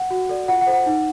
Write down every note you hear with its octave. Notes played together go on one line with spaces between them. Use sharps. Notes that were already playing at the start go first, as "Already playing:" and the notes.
Already playing: F#5
F#4
A4 D5
F4 F#5
F#5
A4 C5
F#5
D#4